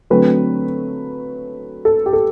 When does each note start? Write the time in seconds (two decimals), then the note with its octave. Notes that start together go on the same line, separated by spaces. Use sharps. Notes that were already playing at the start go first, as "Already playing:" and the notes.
0.10 D3 F#3 A3 C4 B4
1.85 A4
2.06 G4
2.13 A4